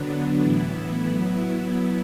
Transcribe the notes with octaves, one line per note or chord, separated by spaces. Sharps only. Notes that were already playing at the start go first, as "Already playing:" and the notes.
Already playing: D3 F#3 B3 D4
A2 E3 B3 E4
F#3 B3 E4